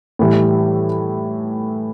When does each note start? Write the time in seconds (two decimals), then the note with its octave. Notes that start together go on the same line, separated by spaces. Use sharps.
0.19 A2 E3 G3